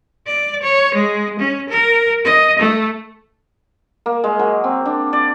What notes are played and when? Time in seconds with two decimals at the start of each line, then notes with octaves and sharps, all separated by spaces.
0.27 D5
0.63 C#5
0.95 G#3
1.39 C#4
1.70 A#4
2.25 D#5
2.59 A3
4.06 A#3
4.24 G#3
4.39 F#3
4.64 C4
4.86 D4
5.13 D5